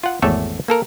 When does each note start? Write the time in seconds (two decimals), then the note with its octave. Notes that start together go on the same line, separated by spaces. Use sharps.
0.03 F4 F#5
0.22 G#1 E2 A3 A4 C#5 E5
0.68 A#3 A4 A#4